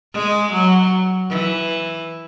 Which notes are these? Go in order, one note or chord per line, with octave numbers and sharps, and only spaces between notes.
G#3
F#3
E3